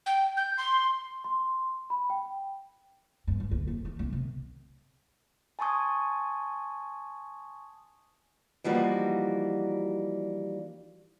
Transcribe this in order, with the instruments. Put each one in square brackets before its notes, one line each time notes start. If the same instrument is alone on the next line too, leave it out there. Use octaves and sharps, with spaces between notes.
[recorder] G5
G6
C6
[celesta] C6
B5
G5
[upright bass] G2
D#2
D2
F#1
D#3
C2
C3
[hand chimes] G#5 A5 C6 C#6 D#6 G#6
[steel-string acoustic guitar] E3 F3 G3 A#3 D#4 F#4